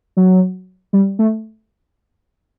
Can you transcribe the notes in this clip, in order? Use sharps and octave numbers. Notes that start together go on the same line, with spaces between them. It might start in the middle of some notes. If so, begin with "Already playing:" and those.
F#3
G3
A3